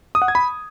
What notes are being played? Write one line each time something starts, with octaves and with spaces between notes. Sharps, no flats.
D#6
F#5
G#6
B5